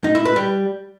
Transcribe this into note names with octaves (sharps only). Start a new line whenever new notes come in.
D#4
E4
B4
G3